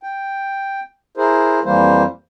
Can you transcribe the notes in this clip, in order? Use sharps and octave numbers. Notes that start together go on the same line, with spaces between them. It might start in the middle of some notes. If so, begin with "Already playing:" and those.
G5
E4 G#4 A#4 C5
F2 E3 G3 A#3 C5